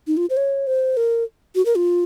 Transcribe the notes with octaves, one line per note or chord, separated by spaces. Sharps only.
D#4
F4
C5
C#5
C5
A#4
F#4
A#4
F4